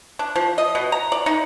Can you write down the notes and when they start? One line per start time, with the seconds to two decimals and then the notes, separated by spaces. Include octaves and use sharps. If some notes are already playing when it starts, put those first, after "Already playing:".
0.19 D4
0.36 F3
0.58 D#5
0.75 B2
0.92 A#5
1.12 D5
1.26 D#4